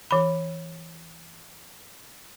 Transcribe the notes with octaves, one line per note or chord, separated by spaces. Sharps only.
E3 B5